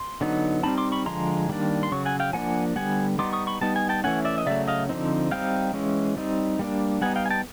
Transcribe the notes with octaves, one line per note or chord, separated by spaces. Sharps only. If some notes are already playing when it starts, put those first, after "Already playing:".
Already playing: C6
D3 F#3 B3 D#4
G3 C4 D#4 A5 B5
C6 D6
B5 C#6
D3 F3 G#3 A#5 C6
D#3 G3 A#3 D4
C6
C#3 F#3 C#6
F#5 G#5
F5 G5
F3 A#3 D4 F#5 G#5
D3 G3 B3 F#5 G#5
G3 B3 D#4 C6 D6
C#6 D#6
B5 C#6
G3 B3 D#4 A5
G#5
G5 A5
E3 A3 C#4 F#5 G#5
D5 E5
D#5
C#3 F#3 A3 D5 E5
D#5 F5
D3 F3 A3 C4 D#4
G3 C4 D#4 F5 G5
E3 G#3 C#4
G3 C4 D#4
G3 A#3 D4
G3 B3 D#4 F#5 G#5
F5 G5
G#5
G5 A5